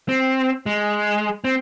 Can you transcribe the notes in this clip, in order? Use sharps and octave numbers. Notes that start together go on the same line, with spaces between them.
C4
G#3
C4